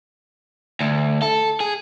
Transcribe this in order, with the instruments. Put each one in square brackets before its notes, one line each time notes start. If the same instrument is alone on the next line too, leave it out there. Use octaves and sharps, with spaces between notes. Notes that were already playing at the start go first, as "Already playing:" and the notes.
[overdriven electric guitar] D2
A4
G#4